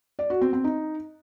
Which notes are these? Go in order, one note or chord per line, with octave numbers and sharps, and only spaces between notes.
D5
F#4
C4
C4
D#4